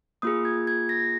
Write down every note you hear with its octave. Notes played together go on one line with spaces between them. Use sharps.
A#3 F4 G#4 D#6
G#6
G#6
A#6